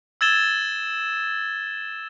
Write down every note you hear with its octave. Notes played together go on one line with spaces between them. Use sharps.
E6 G#6 A6 E7 G7